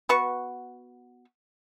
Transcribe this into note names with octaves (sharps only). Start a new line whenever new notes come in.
B3 F#4 B4 C#6